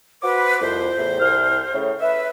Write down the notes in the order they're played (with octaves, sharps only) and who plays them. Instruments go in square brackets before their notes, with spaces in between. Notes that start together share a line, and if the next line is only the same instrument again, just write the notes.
[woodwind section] F#4 C5 D6 [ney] B4
[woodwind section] C2 F2 [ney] C5
[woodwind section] E2 A2
C2 F6
A2 C#3
[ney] B4 [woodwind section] E5